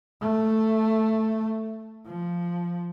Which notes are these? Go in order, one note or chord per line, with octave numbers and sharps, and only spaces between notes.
A3
F3